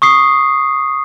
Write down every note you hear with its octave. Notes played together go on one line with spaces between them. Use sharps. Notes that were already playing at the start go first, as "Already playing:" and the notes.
C#6 D#6 C7